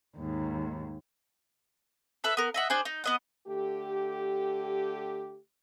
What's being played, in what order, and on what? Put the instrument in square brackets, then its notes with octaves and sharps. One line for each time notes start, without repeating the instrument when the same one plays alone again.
[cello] D#2 G#2
[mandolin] A4 B4 E5
B3 A#4
D#5 E5 F#5
D4 G#4 C5
D#4
B3 D#5 F#5
[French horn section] D3 A3 G4